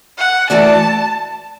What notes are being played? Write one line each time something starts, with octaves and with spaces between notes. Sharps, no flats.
F#5
E3 A3 F#4 D5 A5